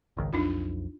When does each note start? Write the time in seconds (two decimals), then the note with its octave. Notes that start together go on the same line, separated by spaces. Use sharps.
0.17 G#1 C#2 D#3
0.33 B1 F2 D4 D#4 F4